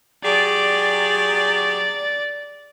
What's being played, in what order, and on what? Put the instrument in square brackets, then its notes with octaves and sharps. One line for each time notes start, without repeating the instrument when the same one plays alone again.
[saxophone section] F#3 G4 G#4 [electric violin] D5